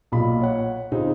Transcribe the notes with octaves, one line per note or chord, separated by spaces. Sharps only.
B1 A#2 F4 B5
C#5 F#5
C#3 C4 D#4 F4 G#4